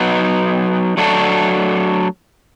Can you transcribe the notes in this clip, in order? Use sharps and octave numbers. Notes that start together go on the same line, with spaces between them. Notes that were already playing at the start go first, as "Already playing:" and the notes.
Already playing: F#3 B3 D#4
F#3 A3 D4 F#4 A4